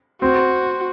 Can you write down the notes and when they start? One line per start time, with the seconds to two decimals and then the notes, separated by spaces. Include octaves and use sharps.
0.21 C4 F#4